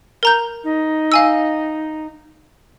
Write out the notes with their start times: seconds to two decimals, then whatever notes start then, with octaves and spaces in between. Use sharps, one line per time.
0.23 A#4 A#5 G6
0.64 D#4
1.12 F5 G#5 E6